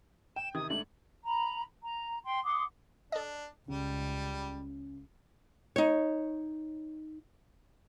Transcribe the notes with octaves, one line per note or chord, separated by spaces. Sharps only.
G5 E7
C3 D#3 D#6 G#6
G#2 A3 D4 F#7
A#5 B5
A#5
G5 C6
F#5 C6 D6 D#6
D4 A4 D#5
C#2 C#3 G3
D#4 C#5